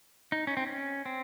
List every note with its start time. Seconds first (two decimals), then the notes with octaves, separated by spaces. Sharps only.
0.32 D#4
0.47 C#4
0.57 C4
0.67 C#4
1.06 C4